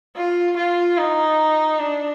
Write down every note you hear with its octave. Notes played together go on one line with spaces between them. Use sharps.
F4
F4
D#4
D4